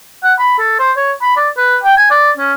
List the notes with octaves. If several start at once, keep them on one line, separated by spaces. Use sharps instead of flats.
F#5
B5
A4
C5
C#5
B5
D5
B4
G5
G#5
D5
C#4